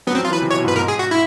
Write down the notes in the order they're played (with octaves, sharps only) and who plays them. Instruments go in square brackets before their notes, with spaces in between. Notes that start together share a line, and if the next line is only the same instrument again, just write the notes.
[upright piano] F#3 [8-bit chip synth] B3
[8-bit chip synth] C4
[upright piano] F3
[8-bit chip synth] F4
[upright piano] E3 [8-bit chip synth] B4
[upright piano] C3
[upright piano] B2 [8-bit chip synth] C#5
[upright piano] G#2
[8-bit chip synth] B4
[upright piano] G#2 [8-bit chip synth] A#4
[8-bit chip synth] G#4
F#4
E4